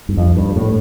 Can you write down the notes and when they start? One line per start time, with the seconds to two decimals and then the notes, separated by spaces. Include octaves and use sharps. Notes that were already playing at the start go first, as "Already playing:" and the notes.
0.09 G2
0.17 F2
0.37 G2
0.56 A2